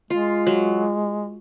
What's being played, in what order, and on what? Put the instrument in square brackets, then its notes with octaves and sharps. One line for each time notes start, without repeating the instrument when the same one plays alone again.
[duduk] G#3 [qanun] F4
[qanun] F#3